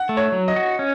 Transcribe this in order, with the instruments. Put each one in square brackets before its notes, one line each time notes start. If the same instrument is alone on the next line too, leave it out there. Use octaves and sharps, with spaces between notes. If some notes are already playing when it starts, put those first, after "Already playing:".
Already playing: [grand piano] F#5
[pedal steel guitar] A3
[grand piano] C#5
[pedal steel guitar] F#3
[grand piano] D#5
[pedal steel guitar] F#4
C#4